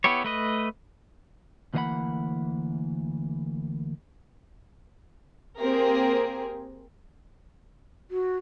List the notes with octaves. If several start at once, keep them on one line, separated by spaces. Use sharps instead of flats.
B3 E4 G4 C#5
A3 B4 D#5
D2 E3 A#3 D#5 F#5 B5
A#3 C4 G4 G#4 A#4
F#4